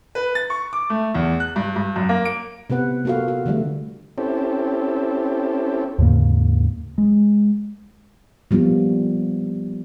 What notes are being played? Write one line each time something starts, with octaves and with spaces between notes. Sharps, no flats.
B4
A6
C#6
D6
A3
E2
F#6
G2
G2
F#2
A#3
D7
C3 B3 B4 F#5
A#3 F4 F#4 A4 F5
F#4
D3 E3 G3 A3
C4 C#4 E4 G4 A4
D#2 G#2 C#3 A#3
G#3
F3 G3 A#3 B3 F4